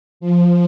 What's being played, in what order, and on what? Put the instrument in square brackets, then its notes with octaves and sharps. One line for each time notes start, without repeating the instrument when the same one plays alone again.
[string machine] F3